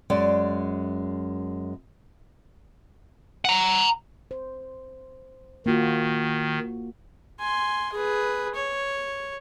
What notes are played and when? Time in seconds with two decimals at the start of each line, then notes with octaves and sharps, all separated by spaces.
0.10 F#2 G#3 D5
3.45 F#5 A#5
4.31 C5
5.66 D#3 A#3 F4 F#4
7.40 G#5 C6
7.92 G#4 B4
8.55 C#5